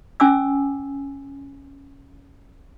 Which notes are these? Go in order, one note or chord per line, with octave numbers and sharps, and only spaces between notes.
C#4 G#5 D6 E6